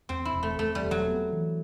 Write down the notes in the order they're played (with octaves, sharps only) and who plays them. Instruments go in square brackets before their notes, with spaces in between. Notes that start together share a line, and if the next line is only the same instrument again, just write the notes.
[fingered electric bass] E2 [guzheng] C4
[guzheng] E4
[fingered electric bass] E1
[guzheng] A3
[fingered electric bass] E2 [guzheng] A3
[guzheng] G3
[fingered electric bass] E1
[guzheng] F#3
[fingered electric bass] B3
E3